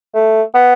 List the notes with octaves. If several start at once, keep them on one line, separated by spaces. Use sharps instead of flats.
A3
B3